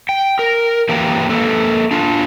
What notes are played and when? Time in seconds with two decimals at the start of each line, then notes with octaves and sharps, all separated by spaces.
0.09 G5
0.39 A#4
0.89 E3 A#3 G4 B4 G5 A#5
1.29 A#3 A4 B4
1.91 D4 F4